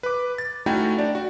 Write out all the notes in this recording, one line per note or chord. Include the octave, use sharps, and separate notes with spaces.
B4 D6
A6
A3 C#4 D#4 E4 F#4 G5
D4 D5
F#4